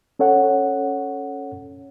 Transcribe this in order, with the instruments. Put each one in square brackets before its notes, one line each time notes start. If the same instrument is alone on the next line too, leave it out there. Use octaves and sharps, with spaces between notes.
[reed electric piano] C#4 A4 C#5 F#5